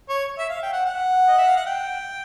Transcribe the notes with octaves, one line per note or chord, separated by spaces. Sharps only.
C#5
E5
F5
G5
F#5
F#5
D#5
E5
F5
F#5
G5